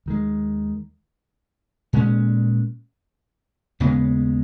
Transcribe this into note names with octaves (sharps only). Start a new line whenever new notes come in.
D#2 D#3 G#3
A#2 G#3 C#4
D#2 C#3 G#3 B3